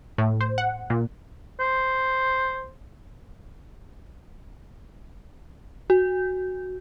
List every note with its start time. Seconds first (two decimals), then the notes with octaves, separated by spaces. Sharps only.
0.18 A2
0.41 C5
0.58 F#5
0.90 A#2
1.60 C5
5.90 F#4